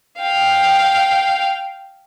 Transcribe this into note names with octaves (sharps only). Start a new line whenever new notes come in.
F5 G5